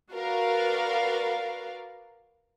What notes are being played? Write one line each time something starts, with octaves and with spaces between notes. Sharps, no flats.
F#4 A#4 B4 D5 F5